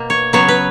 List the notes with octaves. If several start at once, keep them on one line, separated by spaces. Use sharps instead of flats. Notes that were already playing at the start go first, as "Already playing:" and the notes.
Already playing: B2 A#3
C#5
C#3 F#3 B3 C#5
B4